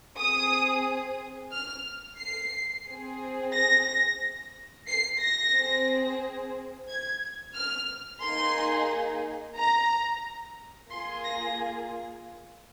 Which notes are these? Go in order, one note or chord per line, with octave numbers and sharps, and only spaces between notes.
C4 G#4 D#6
F6
C7
C4 G#4
A#6
C7
A#6
C4 G#4
G#6
F6
A#3 D#4 G#4 C6
A#5
A#3 F4 G#4 C6
A#6